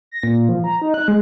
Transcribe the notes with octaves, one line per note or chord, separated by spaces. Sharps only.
A#6
A#2
F3
A#5
D#4
F#6
G#3